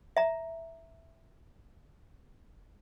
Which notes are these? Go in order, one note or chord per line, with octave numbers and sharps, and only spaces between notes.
E5 A#5